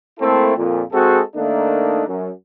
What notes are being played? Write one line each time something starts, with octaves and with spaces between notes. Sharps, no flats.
A3 A#3 C4 E4 A4
F2 A#2
G#3 C4 F#4 G#4 A4
D#3 A3 A#3 D4 D#4
F#2